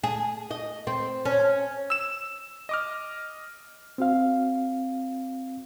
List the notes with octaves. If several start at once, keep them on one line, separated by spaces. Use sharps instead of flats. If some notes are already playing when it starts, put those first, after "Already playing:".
G#4
D#5
C4
C#4
E6 E7
D#5 D6 F6
C4 F#4 F5